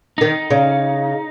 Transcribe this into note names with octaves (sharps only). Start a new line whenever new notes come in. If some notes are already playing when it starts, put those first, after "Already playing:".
D#3 D#4
C#3